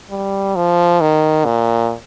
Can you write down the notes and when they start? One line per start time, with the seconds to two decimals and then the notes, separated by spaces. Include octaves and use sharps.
0.10 G3
0.56 F3
1.01 D#3
1.46 A#2